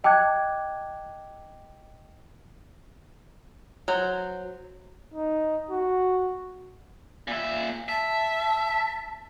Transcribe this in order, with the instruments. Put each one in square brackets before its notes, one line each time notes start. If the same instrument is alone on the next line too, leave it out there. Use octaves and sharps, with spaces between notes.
[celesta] D#5 G5 A5 D6 F#6 G#6
[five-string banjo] F#3 C5
[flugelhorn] D#4
F#4
[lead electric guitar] A#2 E5
[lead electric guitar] E5 [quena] A5